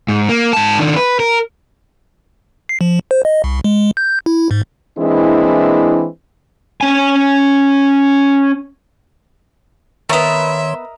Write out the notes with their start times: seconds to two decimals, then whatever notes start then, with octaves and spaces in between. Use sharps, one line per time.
0.08 G#2
0.29 A#3
0.53 G#2 A5
0.79 D#3 D4
0.96 B4
1.20 A#4
2.69 C7
2.81 F3
3.11 C5
3.25 D#5
3.44 C2
3.64 G#3
3.97 G6
4.26 E4
4.51 G#2
4.99 E3 G#3 A#3 C4 D4 E4
6.81 C#4 G#5
10.09 D#3 A3 B3 A#4 C#5 D#5 E5 C6